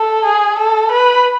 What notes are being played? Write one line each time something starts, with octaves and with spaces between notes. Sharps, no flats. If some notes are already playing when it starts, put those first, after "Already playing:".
Already playing: A4
G#4
A4
B4